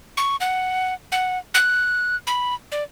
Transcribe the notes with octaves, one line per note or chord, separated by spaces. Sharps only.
C#6
F#5
F#5
F#6
B5
D5